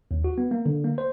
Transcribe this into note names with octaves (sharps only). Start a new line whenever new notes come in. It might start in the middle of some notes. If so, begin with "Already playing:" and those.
D#2
F#4
B3
A#3
D3
A#3
C5